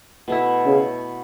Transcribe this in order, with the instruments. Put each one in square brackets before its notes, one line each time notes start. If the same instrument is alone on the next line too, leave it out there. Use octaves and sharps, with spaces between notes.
[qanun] B2 A3 E4
[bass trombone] C#3